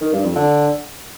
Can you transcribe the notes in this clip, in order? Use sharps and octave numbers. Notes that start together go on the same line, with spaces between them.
D#3
G2
F2
D3